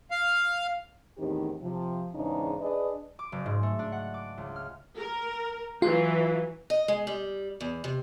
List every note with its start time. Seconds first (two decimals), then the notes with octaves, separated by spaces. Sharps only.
0.11 F5
1.18 E2 A2 D#3 C4 D#4 G4
1.62 C3 F3
2.15 E2 G#2 C#3 E3 D4 D#4
2.61 D4 G#4 B4 D5 D#5
3.19 D6
3.32 F#1
3.46 G#2
3.63 A3
3.79 D4
3.92 F#5
4.14 D6
4.38 C#2
4.56 F6
4.98 A#4
5.82 E3 F#3 F4
6.70 D#5
6.88 G#3
7.07 G3
7.61 E2
7.84 C3